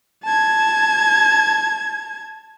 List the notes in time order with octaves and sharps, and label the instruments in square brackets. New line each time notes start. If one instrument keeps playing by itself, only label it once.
[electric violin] A5 G#6